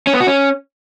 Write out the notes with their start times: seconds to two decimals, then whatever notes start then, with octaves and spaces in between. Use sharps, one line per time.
0.07 C#4
0.14 B3
0.20 F#4
0.27 C#4